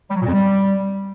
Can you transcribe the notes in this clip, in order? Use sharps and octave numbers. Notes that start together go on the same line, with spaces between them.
G3
F#3
A#2
F2
G3